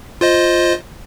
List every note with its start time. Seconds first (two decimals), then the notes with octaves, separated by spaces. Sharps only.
0.21 F4 C5 D#5